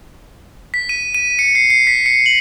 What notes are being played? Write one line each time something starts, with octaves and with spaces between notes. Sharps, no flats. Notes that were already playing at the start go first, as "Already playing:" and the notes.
B6
D#7
D#7
C#7
C7
C7
B6
C#7
F#7